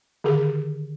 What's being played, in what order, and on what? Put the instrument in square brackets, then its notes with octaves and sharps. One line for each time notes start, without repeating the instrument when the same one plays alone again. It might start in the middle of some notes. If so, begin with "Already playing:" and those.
[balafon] D3 D#3 G4 G#4